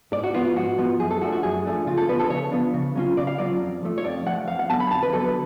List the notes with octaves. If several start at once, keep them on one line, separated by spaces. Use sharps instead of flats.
G#2 D5
F#4
F3 B3 F4
F4
G#2 F#4
F3 B3
F#2 G#4
A4
F3 A3 D4 F#4
F#4
F#2 G#4
F3 A3 D4
C#3 F4
A4
F3 B3 D4 B4
A4
C#3 C#5
F3 B3 D4
C#3
F#3 C#4 F4
C#3 D5
F5
F#3 C#4 F4 D5
F2
F3 A3
C#5
F2 D5
F3 A3 F#5
F2 F5
F#5
D3 F#3 B3 A5
B5
F2 A5
B4
D3 F#3 B3 A4
B4